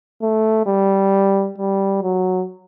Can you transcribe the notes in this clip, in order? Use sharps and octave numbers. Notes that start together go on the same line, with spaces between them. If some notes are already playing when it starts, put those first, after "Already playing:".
A3
G3
G3
F#3